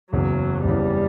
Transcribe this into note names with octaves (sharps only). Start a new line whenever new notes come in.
F#1 E2 C#3 E3 F#3
F#1 E2 C#3 E3 G3